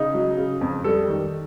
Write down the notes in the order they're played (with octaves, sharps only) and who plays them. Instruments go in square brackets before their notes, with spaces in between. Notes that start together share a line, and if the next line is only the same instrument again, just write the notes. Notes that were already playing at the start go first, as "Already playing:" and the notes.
Already playing: [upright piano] C#3 D#4
F#3
C#3
F2
G3 A4
D#3